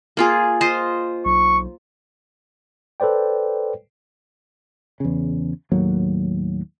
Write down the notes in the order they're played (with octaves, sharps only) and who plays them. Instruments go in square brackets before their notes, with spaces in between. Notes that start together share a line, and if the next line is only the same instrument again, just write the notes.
[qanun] A#3 F4 G#4
F4 C5 D#5
[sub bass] B1 [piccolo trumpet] C#6
[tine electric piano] A4 B4 C5 D5 G5
[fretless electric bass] E2 C#3
D#2 A2 F#3 A#3